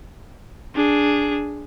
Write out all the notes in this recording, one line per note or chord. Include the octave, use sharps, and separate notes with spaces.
D4 G#4